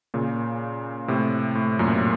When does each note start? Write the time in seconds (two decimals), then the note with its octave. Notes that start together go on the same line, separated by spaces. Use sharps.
0.14 A#2 C#3
1.08 A2 C3
1.55 A2
1.79 F#2 A#2